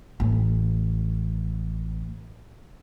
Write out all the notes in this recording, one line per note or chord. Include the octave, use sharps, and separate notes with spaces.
A1 C#3